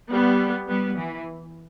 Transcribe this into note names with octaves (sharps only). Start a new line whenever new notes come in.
G3 B3
G3 B3
E3